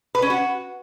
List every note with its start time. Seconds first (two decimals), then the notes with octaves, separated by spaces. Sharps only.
0.15 B4
0.22 C#4
0.30 F#4